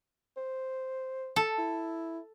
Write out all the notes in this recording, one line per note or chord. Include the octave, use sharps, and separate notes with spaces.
C5
A4
E4